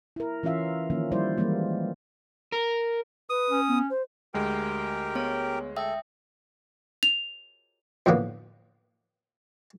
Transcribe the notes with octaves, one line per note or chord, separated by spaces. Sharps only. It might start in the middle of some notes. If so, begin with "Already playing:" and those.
E4 A#4
E3 C#4 F4 E5 F5
D#3 F3 A#3 C#4
F3 G3 E4 C5 D5
E3 F3 G3 G#3 A#3 E4
A#4
B4 D#6
C#4
B3
C5
D2 G#3 G4 A#4 G5
B3 C#5
A4 E5 G5 D#6
F7
F2 A2 D3 A#3 B3